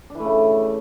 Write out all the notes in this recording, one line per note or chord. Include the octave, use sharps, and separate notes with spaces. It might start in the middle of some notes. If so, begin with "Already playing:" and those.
D4
E3
A3
C#3